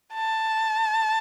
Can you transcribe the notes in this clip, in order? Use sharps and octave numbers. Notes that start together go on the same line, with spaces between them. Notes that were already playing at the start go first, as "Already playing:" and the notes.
A5